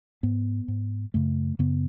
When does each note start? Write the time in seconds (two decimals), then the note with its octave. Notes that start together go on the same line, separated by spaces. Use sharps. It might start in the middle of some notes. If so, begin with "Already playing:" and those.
0.23 G#2 B3
0.68 G#2
1.14 F#2 C#3 A3
1.59 F#2 C#3 B3